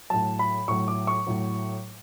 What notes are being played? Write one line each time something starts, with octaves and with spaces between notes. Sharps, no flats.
A2 F#3 A5
B5
A2 F#3 C#6
D6
C#6
A2 F#3